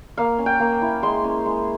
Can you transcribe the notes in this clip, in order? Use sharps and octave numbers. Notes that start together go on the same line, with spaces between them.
A#3 F5
C#4
G5
A#3
E4
G#3 C6
C#4
G#3